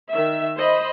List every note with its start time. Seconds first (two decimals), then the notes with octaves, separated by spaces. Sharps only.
0.11 D#3 E5
0.56 C5 D#5 B5